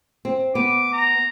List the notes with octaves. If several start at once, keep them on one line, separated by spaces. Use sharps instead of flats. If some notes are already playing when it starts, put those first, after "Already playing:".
C4
B3 D6
A#5